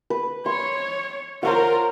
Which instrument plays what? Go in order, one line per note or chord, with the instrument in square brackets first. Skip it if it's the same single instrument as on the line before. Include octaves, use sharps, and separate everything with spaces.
[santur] B4
[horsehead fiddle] C#5 [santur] C6
[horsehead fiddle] F4 A#4 [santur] C5 C#5 F#5